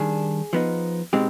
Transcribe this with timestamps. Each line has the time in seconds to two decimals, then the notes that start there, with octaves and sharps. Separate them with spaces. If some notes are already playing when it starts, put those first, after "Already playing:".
Already playing: D#3 G3 D4 G#4
0.53 F3 B3 D#4
1.13 B2 G#3 C4 D#4 G4